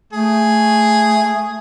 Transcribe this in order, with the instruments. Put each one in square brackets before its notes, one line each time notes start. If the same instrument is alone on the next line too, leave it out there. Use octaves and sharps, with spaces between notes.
[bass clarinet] A3 [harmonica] G#4